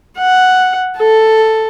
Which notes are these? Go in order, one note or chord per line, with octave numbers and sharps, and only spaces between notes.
F#5
A4